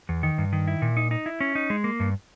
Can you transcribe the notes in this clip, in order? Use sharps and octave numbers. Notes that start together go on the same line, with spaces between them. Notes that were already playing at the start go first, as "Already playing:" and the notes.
E2
D#3
G2
D#3
E4
A#2
D#4
D#4
E4
C#4
D#4
G#3
A#3
G2